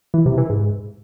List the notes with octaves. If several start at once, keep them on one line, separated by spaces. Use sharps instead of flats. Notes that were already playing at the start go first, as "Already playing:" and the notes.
E3
C3
E3
G#2